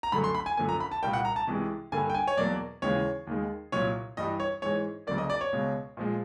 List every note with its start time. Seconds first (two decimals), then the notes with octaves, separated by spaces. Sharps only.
0.03 A#5
0.12 F#2 D3 F#3 A3 B5
0.24 C6
0.35 B5
0.46 G#5
0.57 F#2 D3 F3 A#3 G#5
0.69 A#5
0.80 B5
0.92 A5
1.03 C2 A#2 G3 A#3 G5
1.13 F#5
1.25 A#5
1.36 A5
1.47 C2 C3 E3 G#3
1.92 G2 D3 G3 A#3 G#5
2.10 G5
2.14 G#5
2.27 C#5
2.37 E2 B2 F#3 A#3 D5
2.82 D#2 C#3 E3 G#3 C#5
3.27 D#2 D#3 G#3
3.72 C2 A#2 F#3 C#5
4.17 G2 E3 G3 D#5
4.40 C#5
4.62 G#2 E3 G#3 C#5
5.07 D2 C#3 F#3 A#3 D5
5.18 D#5
5.30 D5
5.41 C#5
5.52 C#2 B2 G#3
5.97 A#2 F3 G#3